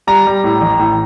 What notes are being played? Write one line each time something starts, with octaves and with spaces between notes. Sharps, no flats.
G3 A#5
G3
A2
A1
A2